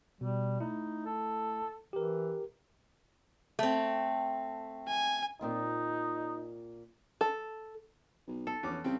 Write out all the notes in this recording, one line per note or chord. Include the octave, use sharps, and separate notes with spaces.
B2 G3
A3 D#4 E4
A4
E3 G4 A#4
A3 C4
G#5
A#2 C4 D#4 F4
A4
B1
A4
A#1 E2 C#4 D6
C2 C#3 C4 G5